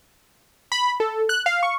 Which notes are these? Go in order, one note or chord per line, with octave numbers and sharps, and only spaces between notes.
B5
A4
F#6
F5
C#6